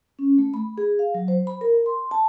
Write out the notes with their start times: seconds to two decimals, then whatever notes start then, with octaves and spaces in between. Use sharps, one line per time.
0.19 C#4
0.38 A3
0.54 B5
0.78 G#4
0.99 F5
1.14 F#3
1.28 C5
1.47 B5
1.61 A#4
1.86 C6
2.11 A5